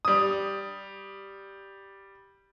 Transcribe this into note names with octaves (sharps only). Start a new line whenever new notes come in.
G3 D#6